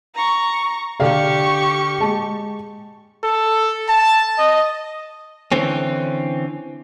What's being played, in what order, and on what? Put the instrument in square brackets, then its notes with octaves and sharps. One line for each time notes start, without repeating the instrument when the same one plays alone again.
[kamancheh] A#5 C#6
[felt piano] D3 D5 F5 [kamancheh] G4 C#6
[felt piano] G#3 A5
[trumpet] A4
A5
D#5
[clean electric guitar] D3 E3 C4 C#4